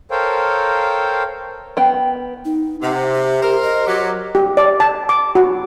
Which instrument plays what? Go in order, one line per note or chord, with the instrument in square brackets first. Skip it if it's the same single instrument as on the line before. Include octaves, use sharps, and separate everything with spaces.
[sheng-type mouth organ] A4 A#4 C5 C#5 F5 G5
[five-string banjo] B3 G5
[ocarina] D#4
[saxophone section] C3 [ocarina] F#5
[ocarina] G4
[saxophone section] A#4 C5
[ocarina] D#5
[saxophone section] F#3 G4
[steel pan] G4
D5
A5
D6
F#4